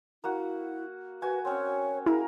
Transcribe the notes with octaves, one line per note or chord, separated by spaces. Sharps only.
A#3 E4 F#4 F#5
F#4 B4 G#5
C4 C#4 C#5
A#3 E4 G#4 A#4 B5